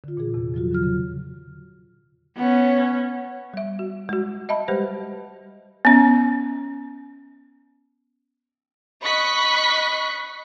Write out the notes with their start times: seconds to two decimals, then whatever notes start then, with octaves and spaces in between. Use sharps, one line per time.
0.04 D3 F4
0.17 A#2 E3 G#4
0.34 E2 C3
0.54 F3 F#3 F4 F#4
0.71 D3 F#3 F6
0.83 C#3
2.37 B3 C#4
3.54 G3 E5
3.79 F#4
4.09 G#3 F#4
4.49 D#5 E5 A5 B5
4.68 G3 G#3 G4 B4 C5
5.85 B3 C#4
9.02 D#5 B5 C#6 F#6 B6